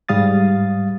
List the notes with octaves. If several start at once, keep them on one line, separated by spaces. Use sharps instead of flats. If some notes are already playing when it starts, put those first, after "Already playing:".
G#2 G3 F5 D#6 A6